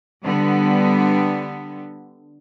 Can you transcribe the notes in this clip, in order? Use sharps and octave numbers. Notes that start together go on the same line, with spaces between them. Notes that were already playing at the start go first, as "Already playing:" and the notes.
D3 G3 B3